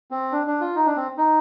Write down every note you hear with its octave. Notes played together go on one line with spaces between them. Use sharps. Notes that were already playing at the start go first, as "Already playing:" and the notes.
C4
D4
D4
F4
D#4
D4
C4
D#4